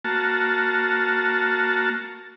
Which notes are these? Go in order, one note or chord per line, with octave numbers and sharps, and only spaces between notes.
A#3 F#4 A5